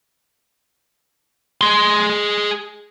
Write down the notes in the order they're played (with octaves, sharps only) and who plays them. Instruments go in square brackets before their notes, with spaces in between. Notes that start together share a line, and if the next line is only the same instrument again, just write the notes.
[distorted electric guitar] G#4 C6